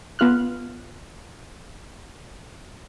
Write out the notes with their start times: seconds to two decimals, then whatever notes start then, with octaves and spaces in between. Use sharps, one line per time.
0.19 B3 F4 F6 F#6